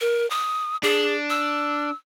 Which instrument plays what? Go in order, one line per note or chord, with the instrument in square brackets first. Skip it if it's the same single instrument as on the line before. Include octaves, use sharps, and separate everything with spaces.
[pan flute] A#4
D#6
[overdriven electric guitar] D4 [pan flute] G#4
[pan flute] E6